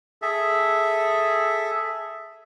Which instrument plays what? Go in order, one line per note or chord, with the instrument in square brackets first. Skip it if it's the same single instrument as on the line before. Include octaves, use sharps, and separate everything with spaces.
[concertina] G#4 A4 E5